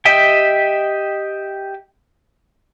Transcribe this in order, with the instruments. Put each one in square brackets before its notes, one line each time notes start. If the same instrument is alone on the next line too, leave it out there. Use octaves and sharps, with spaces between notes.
[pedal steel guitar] G4 D#5 E5 G5